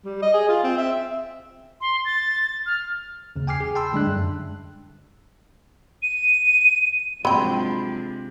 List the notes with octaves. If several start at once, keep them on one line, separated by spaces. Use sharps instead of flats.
G3
D#5
G#4
F4
C4
E5
C6
A6
F6
D#2 C#3
G5 G#5 D6 F6 C7
G#4
G5 A5 B5 C6 E6
D3 G3 G#3 D4 F#6
F#2
D#7
C3 F3 F#3 G#3 D4 G5 B5 C6